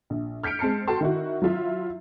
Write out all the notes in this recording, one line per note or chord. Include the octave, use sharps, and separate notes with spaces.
A#1
F6 G6 B6 C#7 D7
G#3 C4 A5 C7 C#7
F#4 A4 G5 A5 C6
D#3 E4 F#4
F#3 E4 F4 E5